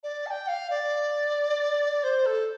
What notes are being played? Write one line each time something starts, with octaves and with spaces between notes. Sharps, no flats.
D5
A5
G5
F5
D5
C5
A4